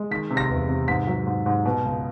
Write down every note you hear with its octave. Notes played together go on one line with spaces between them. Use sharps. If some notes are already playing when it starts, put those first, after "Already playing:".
Already playing: G#3
D#3 B6
C3
A#6
E2
C3
G#2 B6
F#3
G#2
G#2
B2
C#2